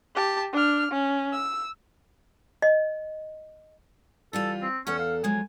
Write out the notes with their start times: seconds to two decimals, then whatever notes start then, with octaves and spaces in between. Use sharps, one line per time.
0.15 G4 A5
0.53 D4 F6
0.91 C#4
1.33 E6
2.62 D#5
4.33 E3 G3 F4 A4
4.62 C4
4.87 E2 C#4 A4 F#5
4.99 F5
5.24 F3 F#3 G#3 G#5